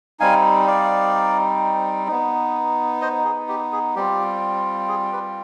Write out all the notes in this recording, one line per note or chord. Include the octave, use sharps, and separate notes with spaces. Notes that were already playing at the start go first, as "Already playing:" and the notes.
G3 C4 D#4 F5 G#5
D5 F5
B3 D#4
C5 D#5
G#4
G4
G#4
G3 C4 F4 G4
G#4
G4 B4